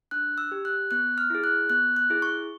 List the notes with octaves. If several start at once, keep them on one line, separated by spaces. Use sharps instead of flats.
D4 F#6
E6
G4
F#6
B3 F#6
F6
E4 G#4
F#6
B3 F#6
F#6
E4 G#4
C#6